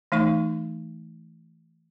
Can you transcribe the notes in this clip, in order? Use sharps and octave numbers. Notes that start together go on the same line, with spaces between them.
E3 A3 D#4 C#6